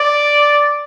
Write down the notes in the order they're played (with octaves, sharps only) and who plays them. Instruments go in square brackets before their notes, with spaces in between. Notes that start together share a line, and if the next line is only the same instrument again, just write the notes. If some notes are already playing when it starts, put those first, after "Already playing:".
Already playing: [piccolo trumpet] D5